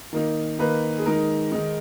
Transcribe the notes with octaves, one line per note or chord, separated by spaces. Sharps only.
D#3 A#3 D#4
D#3 A#3 D#4 B4
G#4
D#3 G#3 D#4 A#4
D#3 G#3 D#4